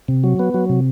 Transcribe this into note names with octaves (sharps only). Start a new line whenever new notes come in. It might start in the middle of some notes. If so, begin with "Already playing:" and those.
C3
F#3
B3
F#3
C3